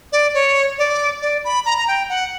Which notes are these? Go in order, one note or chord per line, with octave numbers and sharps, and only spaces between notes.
D5
C#5
D5
D5
B5
A#5
A#5
G5
F#5